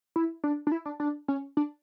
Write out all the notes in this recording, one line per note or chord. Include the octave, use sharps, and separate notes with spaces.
E4
D4
D4
E4
D4
D4
C#4
D4